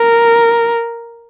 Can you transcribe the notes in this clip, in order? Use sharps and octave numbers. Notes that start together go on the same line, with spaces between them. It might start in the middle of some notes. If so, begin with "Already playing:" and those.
Already playing: A#4